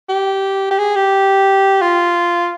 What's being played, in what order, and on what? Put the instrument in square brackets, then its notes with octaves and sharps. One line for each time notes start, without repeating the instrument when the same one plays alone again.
[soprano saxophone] G4
G4
G#4
G4
F4